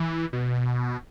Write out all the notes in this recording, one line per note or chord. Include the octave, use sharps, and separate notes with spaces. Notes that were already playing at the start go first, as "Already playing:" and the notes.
Already playing: E3
B2